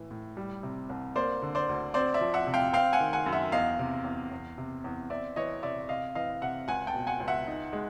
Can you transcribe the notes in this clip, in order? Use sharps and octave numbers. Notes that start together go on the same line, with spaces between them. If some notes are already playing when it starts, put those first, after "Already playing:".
Already playing: A2 E3
A2
G3
C3
C2
A#3 C5 D5
D3
C5 D5
D2
C4 C5 D5
D5 E5
F3
E5 F#5
C3
F5 G5
C4 F5 G5
F#5 G#5
D#3
F#5 G#5
F#2
E5 F#5
E2 D#5 F5
C3
E2
E2
C3
E2
C4 D5 E5
E3 C#5 D#5
C3 D5 E5
C3 D#5 F5
E3 D#5 F5
C3 E5 F#5
C#2 F#5 G#5
G5 A5
B2
F#5 G#5
C#2
E5 F#5
D#4
G#3